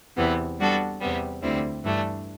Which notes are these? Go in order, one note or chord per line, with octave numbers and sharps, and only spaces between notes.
E2 C3 E3 B3
G3 B3 D4 F#4 A4
E2 C3 G3 B3
D2 D3 G3 C4 E4
G2 E3 A3 D4